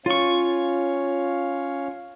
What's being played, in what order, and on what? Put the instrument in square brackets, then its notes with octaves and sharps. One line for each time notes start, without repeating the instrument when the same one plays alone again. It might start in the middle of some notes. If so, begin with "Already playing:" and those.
[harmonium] C#4 C#5 F5 [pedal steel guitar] F4 C#6